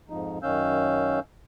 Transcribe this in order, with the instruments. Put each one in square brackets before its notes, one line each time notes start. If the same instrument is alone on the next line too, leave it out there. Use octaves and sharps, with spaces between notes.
[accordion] F2 G#2 F3 D#4
F#2 D#3 C#4 F5 E6 G6